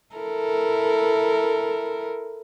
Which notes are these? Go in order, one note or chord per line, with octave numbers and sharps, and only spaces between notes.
E4 A4 A#4